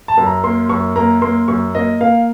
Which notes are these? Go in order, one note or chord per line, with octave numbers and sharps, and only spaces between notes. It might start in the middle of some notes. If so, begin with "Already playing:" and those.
A5
F#2
A#5
A#3 C6
F#2 C#6
A#3 A#5
A#3 C6
F#2 C#6
A#3 D#5
A#3 F5